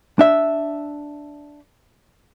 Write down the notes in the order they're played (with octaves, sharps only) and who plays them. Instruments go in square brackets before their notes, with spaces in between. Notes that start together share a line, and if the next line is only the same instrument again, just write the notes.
[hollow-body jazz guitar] D4 E5